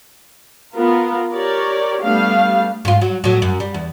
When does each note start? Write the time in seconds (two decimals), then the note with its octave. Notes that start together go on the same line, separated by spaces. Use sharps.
0.75 B3 F4 A#4
1.33 G4 A#4 C#5 D5
2.03 G3 A3 B3 D4 F5
2.85 G#2 F4
3.02 F#3
3.24 A2 F#3
3.42 F#2
3.60 G3
3.74 E2